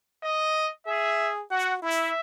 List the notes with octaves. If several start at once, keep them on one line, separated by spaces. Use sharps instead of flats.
D#5
G#4 E5
F#4 F#5
E4 E5